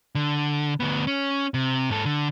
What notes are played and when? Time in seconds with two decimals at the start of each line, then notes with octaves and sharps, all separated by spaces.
0.15 D3
0.80 D2 B3
1.07 C#4
1.54 C3
1.90 G#2 A4
2.05 D3